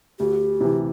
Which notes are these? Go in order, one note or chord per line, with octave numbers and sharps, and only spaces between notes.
D2 G4
C3 E3